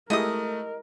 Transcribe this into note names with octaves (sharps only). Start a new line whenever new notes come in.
G#3 A3 E4 G4 A#4 D#5 D#6